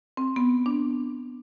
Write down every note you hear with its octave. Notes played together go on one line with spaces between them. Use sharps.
C4
B3
D4